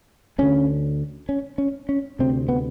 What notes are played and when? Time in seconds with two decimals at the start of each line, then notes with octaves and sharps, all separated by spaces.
0.38 D2 D3 C#4
1.29 C#4
1.58 C#4
1.89 C#4
2.19 D2 C3 C4
2.49 B3